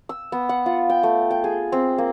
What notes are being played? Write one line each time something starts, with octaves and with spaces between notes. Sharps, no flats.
E6
B3
F#5
F4
G5
A3
G5
G#4
C4
A#3